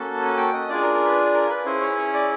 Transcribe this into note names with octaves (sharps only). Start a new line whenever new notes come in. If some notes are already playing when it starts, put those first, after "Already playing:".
Already playing: A#3 C#4 F#4 A4 A5
G#5
G5
D#5
D4 F4 G#4 D5
A#4
A#4
B4
A#4
B4
C#4 E4 G#4 C5
C#5
C#5
D5